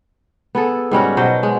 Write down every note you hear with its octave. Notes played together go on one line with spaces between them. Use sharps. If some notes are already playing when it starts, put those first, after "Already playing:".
B3 G#4 A4
G#2 G3 C#4 F#4
B2 F#3 C5 D#5
G#3